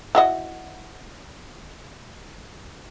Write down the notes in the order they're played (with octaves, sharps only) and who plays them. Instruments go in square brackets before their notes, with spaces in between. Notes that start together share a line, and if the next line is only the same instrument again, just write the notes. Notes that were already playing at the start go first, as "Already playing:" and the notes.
[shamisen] E4 F#4 D#5